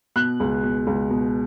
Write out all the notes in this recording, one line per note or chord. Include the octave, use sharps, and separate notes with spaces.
B2 F#6
C#2
B2
C#2
B2